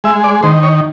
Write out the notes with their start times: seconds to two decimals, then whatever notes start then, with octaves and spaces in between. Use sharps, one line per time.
0.04 G#3 E5
0.24 D5
0.43 D#3 C5
0.63 C#5